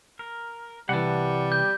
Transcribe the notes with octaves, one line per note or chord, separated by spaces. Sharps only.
A#4
C2 E3 G3 F#5 A5
G4 G6